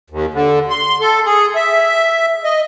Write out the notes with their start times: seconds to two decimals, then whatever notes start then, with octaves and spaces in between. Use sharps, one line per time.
0.10 D#2
0.33 D3
0.70 C6
1.01 A4
1.26 G#4
1.55 E5
2.44 D#5